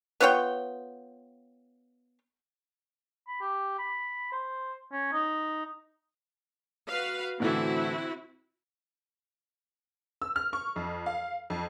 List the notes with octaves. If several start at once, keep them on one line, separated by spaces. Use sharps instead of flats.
B3 F4 C#5 G5
B5
G4
B5
C5
C#4
D#4
F#4 B4 F5
A2 D3 E3 C4 E4 F#4
E6
F6
C#6
F2
F5
F2